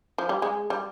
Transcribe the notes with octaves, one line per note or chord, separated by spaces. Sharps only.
F3
G3
G#3
G3